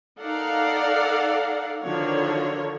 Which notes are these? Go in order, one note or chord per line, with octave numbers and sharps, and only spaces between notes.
D#4 A4 A#4 D5 F5 F#5
D3 D#3 F3 F#4 C#5